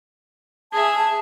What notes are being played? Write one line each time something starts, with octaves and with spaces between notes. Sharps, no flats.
G#4 E5 A5